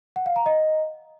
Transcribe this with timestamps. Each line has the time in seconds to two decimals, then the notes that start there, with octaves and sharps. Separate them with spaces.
0.16 F#5
0.26 F5
0.36 A#5
0.46 D#5